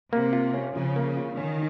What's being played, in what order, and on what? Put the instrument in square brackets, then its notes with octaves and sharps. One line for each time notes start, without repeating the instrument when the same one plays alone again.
[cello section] C3 [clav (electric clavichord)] A#3
[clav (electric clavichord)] F4
C#4
[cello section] C#3 [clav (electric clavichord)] F3
[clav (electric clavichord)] A#3
F4
[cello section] D#3 [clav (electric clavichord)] C#4